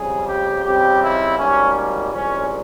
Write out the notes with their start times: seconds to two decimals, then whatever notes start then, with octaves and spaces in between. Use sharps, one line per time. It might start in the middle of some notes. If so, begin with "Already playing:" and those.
Already playing: F2 C#3 G3 G#4
0.28 G4
0.64 F2 C#3 G3 C4 G4
1.01 E4
1.39 G#1 G#2 G3 A#3 C#4
1.75 C#4
2.13 C2 A#2 F3 G#3 C#4